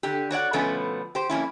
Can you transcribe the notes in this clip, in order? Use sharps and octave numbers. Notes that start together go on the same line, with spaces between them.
D3 G4
F#4 C#5 D5 F#5
B2 D3 F3 A3 B3 C#4
G4 C5
F2 A#3 C#4 E4